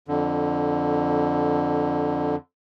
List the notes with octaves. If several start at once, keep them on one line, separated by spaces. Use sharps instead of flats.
F2 D3